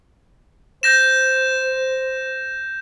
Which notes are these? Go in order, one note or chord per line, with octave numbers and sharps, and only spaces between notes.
C5 G6 A#6 E7